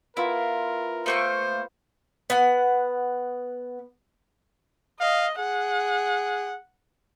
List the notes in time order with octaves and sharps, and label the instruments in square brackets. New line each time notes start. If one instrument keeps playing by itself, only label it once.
[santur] B3 F4 [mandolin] E4 [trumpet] A#4
[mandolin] A3 A#3 C#6 [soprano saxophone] C5 [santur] E5
[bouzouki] B3 F#5
[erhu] D#5 [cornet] F5
[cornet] G#4 [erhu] F#5